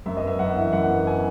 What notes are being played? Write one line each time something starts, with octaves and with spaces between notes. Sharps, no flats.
F#2 E5
D#5
B3 E5
F#2 F#5
E3
F#2 F#5
B3
G#5